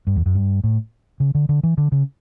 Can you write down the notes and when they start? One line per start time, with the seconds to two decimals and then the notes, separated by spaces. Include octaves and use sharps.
0.07 G2
0.16 E2
0.26 F#2
0.35 G2
0.64 A2
1.20 C#3
1.35 D3
1.49 D3
1.63 E3
1.78 D3
1.92 C#3